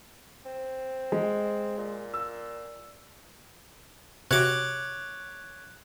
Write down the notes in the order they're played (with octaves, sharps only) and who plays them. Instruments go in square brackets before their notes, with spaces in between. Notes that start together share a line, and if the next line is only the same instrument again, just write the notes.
[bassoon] C4
[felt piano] G#3
[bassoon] A#2
[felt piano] E6
[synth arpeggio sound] C3 F#4 [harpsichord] C#5 D6 [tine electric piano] F#6